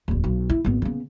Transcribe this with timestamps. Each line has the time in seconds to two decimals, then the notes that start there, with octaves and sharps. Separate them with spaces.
0.08 D1 E2
0.24 B1
0.50 E4
0.65 G#1 B3
0.82 C#3 B3